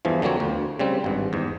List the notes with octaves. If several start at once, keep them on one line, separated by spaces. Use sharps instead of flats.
E2 G2 E3 F3
D3 F#3 A#3 C4 C#5
D2
C#3 G3 C4
G#1 G2
E2 G#2